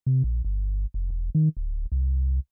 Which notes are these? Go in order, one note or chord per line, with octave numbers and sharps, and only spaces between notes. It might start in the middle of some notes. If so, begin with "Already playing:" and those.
C3
A#1
G1
F1
E1
D#3
D1
C2